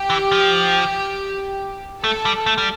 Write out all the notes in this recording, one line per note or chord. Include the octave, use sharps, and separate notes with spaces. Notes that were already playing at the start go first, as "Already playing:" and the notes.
Already playing: G4
E3
F3
A3 A4
G3
A3
G3